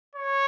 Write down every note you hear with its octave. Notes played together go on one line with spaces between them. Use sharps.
C#5